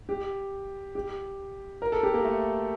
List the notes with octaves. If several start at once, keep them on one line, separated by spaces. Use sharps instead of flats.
G4
G4
A#4
A4
G4
A#3
A3